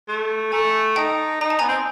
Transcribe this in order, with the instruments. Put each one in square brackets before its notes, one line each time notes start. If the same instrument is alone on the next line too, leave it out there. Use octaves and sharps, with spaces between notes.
[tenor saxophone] A3
[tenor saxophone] A3 [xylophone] G#5 A#5
[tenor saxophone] D#4 [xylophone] G5 A5
[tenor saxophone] D#4 [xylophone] A#5
[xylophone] A5
[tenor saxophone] B3 [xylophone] G#5 A#5
[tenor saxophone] C4